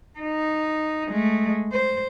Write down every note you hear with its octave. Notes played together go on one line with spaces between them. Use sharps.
D#4
G#3 A3
C5